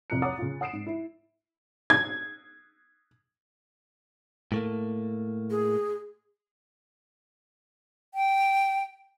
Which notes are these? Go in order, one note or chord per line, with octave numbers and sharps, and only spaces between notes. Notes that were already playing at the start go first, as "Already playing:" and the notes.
C2 F2 F3 A#5 F#6 C#7
C#5 F#5 A#5 D6 D#6 A6
C#3 F4
F#5 D#6 C7 D7 E7
G#2
E4
G#6
A2 A3 A#3
G#4
G5